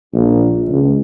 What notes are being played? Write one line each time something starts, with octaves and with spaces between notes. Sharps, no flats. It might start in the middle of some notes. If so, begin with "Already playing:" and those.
A#1
C#2